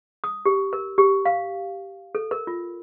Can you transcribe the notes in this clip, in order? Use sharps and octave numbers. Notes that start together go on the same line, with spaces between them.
D#6
G4
A#4
G4
F5
A4
A#4
F4